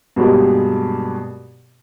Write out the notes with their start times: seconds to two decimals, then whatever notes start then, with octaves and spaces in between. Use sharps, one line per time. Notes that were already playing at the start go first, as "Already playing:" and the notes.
0.16 G2 B2 F#3 G#3 A#3 G4